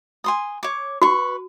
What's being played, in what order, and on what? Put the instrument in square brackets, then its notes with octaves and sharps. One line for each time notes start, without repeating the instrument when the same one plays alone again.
[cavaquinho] G#5 C6 D#6
C#5 D6
[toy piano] F#4 [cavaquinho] B4 C#6